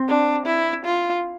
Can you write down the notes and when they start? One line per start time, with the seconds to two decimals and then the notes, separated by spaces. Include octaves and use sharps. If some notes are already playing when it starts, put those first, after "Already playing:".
Already playing: C4
0.08 D4
0.46 E4
0.85 F4